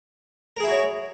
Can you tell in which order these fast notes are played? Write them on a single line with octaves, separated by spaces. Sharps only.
A#4 G#4 E4 F#4 C#5